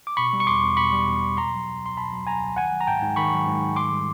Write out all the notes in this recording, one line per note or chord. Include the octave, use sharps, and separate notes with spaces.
D6
B2 B5 C#6
G3
C#6
E2 C6 D6
E2
B2 B5 C#6
G3
E2
E2
B2 A#5 C6
F#3
C#2
C#2 C6
B2 A5 B5
F#3
C#2 G#5 A#5
C#2
D#3 F#5 G#5
F#3
A#5
G#2 G5 A5
G#2
D#3 B5 C#6
F#3
G#2
G#2
D#3 C6 D6
G3